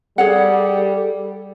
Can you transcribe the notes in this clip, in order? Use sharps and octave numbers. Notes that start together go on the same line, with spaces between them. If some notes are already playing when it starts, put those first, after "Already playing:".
G3 G#4 A4 C#5 F#5